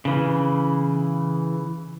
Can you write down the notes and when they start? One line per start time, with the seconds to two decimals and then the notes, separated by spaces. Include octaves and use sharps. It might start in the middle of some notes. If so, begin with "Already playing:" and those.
0.05 C#3 E3